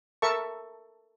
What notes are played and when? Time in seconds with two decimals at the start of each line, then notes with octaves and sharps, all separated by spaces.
0.22 A4 A#4 E5 A5 C#6